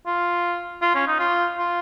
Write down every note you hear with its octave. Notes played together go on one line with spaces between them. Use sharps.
F4
F4
C#4
D#4
F4
F4